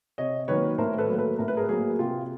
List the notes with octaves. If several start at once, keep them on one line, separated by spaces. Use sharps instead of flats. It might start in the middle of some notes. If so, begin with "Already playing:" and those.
C3 C#5 D#5
D#3 F#3 A#3 B4 C#5
A2 A#4 C5
A4 B4
F#3 A#3
A4 B4
A2 A#4
B4
G#4 A#4
F#3 A#3 F#4 G#4
C3 F4 G4